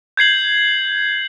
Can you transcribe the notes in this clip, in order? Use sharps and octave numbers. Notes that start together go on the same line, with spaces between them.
G6 G#6 C7 F#7